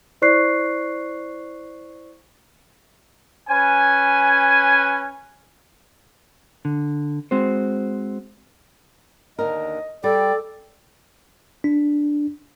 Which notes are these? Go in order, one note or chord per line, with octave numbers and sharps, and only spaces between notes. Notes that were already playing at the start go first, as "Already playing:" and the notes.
E4 C5 D5 C#6 F#6 C7
C#4 B4 G#5
D3
G#3 C4 F#4 C5
D#2 D3 A#4 D#5
G3 A4 D5 G5
D4